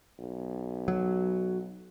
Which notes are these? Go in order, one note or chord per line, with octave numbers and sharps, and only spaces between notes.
B1
F#3